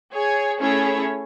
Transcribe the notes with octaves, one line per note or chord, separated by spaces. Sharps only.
G#4 C#5 G#5
A3 C#4 E4 G#4 C#5